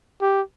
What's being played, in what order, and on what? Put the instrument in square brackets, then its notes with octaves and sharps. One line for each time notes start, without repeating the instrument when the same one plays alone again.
[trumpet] G4